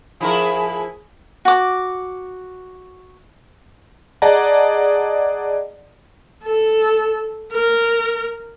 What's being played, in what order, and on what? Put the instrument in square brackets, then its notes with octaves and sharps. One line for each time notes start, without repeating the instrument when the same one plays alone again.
[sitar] F3 E4 A#4 [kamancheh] G#4 B5
[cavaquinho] F#4 D6
[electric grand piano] G#4 D5 D#5 F#5 A5 A#5
[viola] A4
A#4